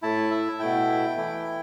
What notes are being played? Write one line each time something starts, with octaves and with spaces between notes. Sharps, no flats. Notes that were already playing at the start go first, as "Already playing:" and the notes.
A2 A3 E4 A5
E5
B2 A3 E4 G5
E3 A3 E4